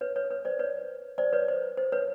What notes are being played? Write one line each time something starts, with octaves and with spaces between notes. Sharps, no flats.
B4 C#5
B4 C#5
B4 C#5
C5 D5
B4 C#5
C5 D5
B4 C#5
C5
C5
B4 C#5